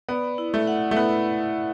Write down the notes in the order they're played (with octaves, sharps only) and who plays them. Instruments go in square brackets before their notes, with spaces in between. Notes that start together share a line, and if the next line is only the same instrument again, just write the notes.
[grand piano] B3 [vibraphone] D5
[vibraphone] E4
[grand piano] A3
[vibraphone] F#5
[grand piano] A3
[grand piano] B3 [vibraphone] E4